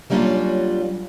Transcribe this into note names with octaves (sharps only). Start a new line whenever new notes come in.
F#3 G3 A#3 C#4 D4 F4